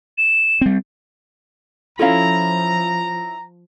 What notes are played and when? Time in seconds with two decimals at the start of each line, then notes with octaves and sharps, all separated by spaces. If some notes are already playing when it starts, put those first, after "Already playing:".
0.18 E7
0.61 G3 C4
1.99 F3 C#4 E4 F4 A4 F5 A#5